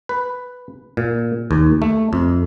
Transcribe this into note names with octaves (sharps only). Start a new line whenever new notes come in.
B4
A#2
D#2
A3
F2